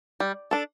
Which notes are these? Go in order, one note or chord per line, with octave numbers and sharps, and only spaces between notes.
G3
D4 A4